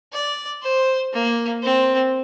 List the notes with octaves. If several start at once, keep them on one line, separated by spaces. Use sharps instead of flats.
D5
C5
A#3
C4